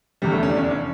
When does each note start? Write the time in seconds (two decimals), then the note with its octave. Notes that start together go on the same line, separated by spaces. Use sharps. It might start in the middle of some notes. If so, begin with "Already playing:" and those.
0.22 F1 E2 D3 G3
0.32 A3
0.43 C#4
0.49 D4
0.57 C#4
0.64 D4
0.71 C#4